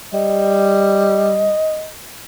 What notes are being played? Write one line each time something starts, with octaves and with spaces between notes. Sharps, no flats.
G3 D#5